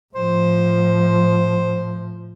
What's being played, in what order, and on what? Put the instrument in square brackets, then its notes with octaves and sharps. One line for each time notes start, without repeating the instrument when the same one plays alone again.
[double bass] A2 F3 [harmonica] C5